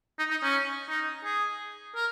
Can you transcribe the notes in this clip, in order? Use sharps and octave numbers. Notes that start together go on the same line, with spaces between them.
D#4
D#4
C#4
D#4
G#4
A#4